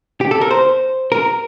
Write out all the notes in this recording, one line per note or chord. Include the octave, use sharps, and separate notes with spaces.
G4
A4
A#4
C5
A#4